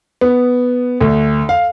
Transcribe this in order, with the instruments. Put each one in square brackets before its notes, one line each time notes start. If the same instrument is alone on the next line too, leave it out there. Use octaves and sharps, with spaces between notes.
[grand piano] B3
D2
F5